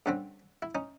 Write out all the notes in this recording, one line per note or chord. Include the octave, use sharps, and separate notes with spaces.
G2 D3 G3 C4 C#4
E4
C#4 D#4